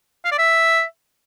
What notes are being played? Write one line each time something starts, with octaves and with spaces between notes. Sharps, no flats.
F5
D5
E5